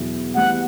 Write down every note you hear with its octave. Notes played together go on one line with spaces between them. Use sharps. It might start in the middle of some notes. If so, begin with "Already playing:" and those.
Already playing: E2 B2 F#3 B3 E4
E3 G3 B3 F#5